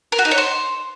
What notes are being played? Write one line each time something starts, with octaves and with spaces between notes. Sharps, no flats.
A#4
F#4
D#4
C#5
C5